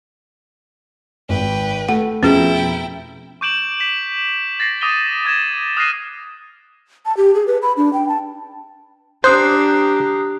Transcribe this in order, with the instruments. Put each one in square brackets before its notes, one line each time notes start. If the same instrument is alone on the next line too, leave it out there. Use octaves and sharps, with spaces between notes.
[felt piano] G#1 [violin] B4 G5
[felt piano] A3 [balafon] F#5
[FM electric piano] F2 B2 A#5 [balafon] C#4 G#4 [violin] E4 G5
[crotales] C#6 D6 G6 D7 E7 F#7
B6 E7
A6 A#6 C7
D6 D#6 A#6 D#7 G7
D#6 G#6 A#6 E7
D#6 F6 F#6 A#6 C7 D#7
[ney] A5
G4
G#4
B4
B5
D4
G5
A5
[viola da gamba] D4 [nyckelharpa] G4 A#5 [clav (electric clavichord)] C5 [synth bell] D#6 F#6 C7